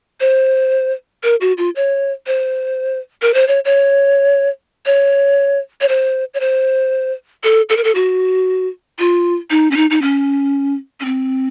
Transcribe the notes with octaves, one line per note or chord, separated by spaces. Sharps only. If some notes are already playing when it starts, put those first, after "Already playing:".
C5
A#4
F#4
F4
C#5
C5
A#4
C5
C#5
C#5
C#5
C#5
C5
C#5
C5
A4
A4
A#4
A4
F#4
F4
D#4
C#4
D#4
D#4
C#4
C#4
C4